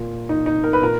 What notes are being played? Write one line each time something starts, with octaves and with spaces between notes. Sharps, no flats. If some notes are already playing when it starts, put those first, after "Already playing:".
Already playing: A#2
D#4
D#4
A#4
B4
A#2 A#4